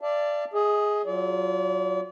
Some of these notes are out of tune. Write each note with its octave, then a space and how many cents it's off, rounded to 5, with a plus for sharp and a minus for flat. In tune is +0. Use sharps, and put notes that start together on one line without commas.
D5 +0 F5 -45 A5 +0
G#4 +0 D#5 +35
F#3 +0 F4 +0 D5 -40